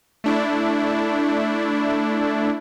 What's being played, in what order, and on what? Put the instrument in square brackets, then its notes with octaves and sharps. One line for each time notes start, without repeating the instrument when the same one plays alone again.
[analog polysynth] A3 D4 E4